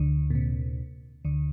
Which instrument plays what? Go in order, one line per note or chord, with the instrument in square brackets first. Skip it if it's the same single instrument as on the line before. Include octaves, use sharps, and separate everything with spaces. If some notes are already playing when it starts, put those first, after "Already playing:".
Already playing: [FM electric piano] D2 D3
A#2
C3
D2 D3